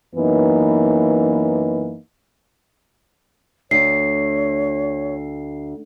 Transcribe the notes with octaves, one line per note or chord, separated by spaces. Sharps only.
F#2 E3 A#3 B3 D#4
D2 C#5 C7